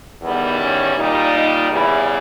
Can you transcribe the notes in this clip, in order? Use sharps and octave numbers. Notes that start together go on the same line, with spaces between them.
E2 D#3 G3 B3
C#4
A#2 G3 D#4
D#4
E2 C#3 E3 G3 E4